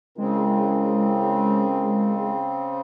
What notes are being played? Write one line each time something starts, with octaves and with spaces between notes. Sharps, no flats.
C#3 G#3 C4 C#4 E4 A#4